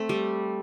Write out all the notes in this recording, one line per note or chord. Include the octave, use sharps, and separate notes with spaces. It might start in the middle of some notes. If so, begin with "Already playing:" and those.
Already playing: A3 C4
G3